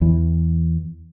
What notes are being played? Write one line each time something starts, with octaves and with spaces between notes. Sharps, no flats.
E2 E3